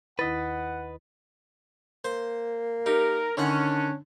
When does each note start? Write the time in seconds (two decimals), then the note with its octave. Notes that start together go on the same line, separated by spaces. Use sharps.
0.19 D#2 D#3 E4 B4 D#5 F#5 A6 B6
2.05 A#3 C5 C6
2.86 D#4 G4 A#4
3.37 D3 D#3 C#4 D4 F#5